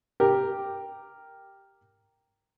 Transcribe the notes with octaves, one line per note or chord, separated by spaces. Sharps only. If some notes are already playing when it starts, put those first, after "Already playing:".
G4 A#4